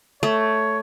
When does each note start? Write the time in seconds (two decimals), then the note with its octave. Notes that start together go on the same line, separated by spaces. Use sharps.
0.23 A3 C#5